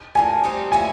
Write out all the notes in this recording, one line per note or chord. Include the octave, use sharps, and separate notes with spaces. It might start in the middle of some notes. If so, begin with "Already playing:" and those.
A2 F3 A#3 G#5
G3 C4 D#4 G4
A#3 C#4 E4 G#5